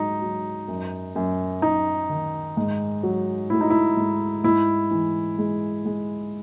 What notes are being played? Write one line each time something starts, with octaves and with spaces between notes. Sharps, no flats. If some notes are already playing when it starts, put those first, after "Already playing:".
Already playing: G#2 F#3 D#4
F#3
F#2
F#2
F#2 D#4
D#3
G#2
F#3
A3 E4
D#4
E4
G#2
G#2 E4
E3
G#3
G#3